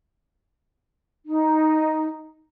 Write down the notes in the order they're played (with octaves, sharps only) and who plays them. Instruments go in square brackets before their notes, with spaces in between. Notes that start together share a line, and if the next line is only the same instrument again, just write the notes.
[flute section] D#4